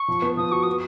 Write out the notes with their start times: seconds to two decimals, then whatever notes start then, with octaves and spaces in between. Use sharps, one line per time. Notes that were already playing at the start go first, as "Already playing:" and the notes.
Already playing: C#6
0.08 F3
0.22 B3
0.37 F3 D#6
0.52 F#4 C#6
0.63 B3 D#6